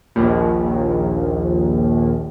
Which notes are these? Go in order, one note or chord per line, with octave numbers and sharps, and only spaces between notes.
A#1 D#2